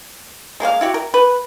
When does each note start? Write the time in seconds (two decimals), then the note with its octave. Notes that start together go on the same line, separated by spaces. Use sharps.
0.60 G#3 A#3 G4 F5
0.81 E4 F#4 G4
0.94 A#4
1.14 B4